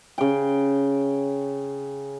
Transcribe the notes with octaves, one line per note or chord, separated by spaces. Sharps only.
C#3 G5